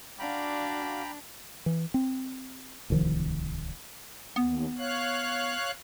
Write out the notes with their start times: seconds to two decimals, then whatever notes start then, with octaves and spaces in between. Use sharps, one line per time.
0.19 D4 F#4 D5 F5 G5 A#5 B5
1.66 E3
1.94 C4
2.90 D1 C2 D#3 F3
4.36 D#2 B3
4.78 C#5 F5 F#6